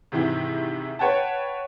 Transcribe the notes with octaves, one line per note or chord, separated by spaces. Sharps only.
G#2 C3 D#3 E3 E4
B4 C#5 F#5 G5 A5